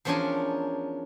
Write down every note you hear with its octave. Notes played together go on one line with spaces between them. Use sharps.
E2 F3 C#4 D4 A#4 G#5